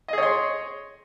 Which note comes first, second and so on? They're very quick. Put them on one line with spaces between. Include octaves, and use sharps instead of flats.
D#5 G#4 C#5 C6